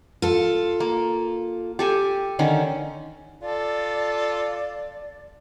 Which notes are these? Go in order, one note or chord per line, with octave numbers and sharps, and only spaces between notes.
F4 A4
A#3
G4 A4 G#5
D3 D#3 C#4
F4 A4 D5